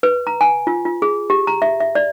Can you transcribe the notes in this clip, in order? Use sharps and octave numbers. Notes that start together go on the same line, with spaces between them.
B4
A#5
G#5
F4
F4
G#4
G4
A#5
E5
E5
D5